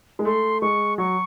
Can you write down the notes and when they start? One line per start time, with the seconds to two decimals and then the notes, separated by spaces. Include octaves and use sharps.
0.19 G#3
0.25 A3 C6
0.62 G#3 C#6
0.98 F#3 C#6